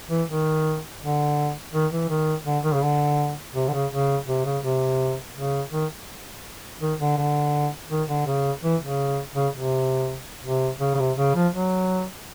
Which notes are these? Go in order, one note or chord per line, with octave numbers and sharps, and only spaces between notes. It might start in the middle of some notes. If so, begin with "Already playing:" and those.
E3
D#3
D3
D#3
E3
D#3
D3
D#3
C#3
D3
C3
D3
C#3
C#3
C3
C#3
C3
C#3
D#3
D#3
D3
D3
D#3
D3
C#3
E3
C#3
C#3
C3
C3
C#3
C#3
C3
C#3
F3
F#3